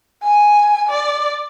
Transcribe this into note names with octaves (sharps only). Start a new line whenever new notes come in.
G#5
D5